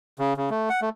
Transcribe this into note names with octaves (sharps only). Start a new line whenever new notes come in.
C#3
C#3
A3
F#5
A3